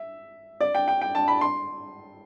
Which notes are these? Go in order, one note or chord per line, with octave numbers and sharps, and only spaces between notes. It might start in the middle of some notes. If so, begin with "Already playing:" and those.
Already playing: E5
D5
G5
G5
G5
A5
B5
C6